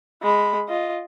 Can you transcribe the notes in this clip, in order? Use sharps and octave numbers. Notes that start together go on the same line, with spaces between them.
G#3 B5
F4 D#5